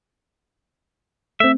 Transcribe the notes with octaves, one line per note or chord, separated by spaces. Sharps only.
A3 C4 E5